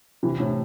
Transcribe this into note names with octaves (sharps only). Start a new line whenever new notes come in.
C3 E3
A2 C3